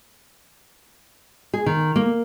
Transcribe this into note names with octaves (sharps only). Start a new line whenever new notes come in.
G#4
D#3
A#3